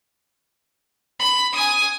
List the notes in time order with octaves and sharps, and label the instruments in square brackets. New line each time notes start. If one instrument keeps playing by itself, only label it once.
[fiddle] B5
G#5 D#6